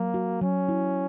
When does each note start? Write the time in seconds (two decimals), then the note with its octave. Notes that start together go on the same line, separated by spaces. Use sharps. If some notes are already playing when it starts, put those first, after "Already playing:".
Already playing: F#3 A#3
0.14 F#4
0.41 F#3 C#4
0.69 E4